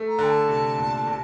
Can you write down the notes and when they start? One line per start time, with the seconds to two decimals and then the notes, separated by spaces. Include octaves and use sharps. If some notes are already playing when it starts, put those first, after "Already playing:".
Already playing: A3
0.08 A#5
0.19 D3 G5
0.29 A5
0.48 C3
0.78 A#2
1.07 C3